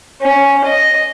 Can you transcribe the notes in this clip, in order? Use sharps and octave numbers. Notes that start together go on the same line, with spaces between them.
C#4
D#5